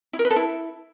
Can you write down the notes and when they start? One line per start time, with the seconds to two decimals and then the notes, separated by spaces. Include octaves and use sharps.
0.13 E4
0.19 A#4
0.25 B4
0.31 A4
0.36 E4